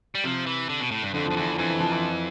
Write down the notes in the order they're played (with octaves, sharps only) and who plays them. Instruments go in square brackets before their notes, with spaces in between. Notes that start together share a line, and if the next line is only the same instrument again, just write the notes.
[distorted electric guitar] G3
[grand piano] C3 [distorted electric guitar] F3
[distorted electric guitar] E3
D3
B2
A2
G2
[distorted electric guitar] F2 [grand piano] D3
[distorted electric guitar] F2 [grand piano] F3
[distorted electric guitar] E2 [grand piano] E3
[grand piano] E3
[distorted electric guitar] F2 [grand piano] E3
[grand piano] E3
F3
E3